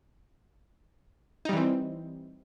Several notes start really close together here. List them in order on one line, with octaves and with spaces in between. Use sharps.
D#4 G3 E3 C4